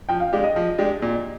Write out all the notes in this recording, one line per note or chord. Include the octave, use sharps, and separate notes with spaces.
F3 G5
F5
G#3 D4 G4 F5
D#5
F3
G#3 D4 G4
A#2